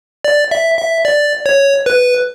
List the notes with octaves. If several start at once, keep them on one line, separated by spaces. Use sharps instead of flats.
D5
E5
E5
D5
C#5
B4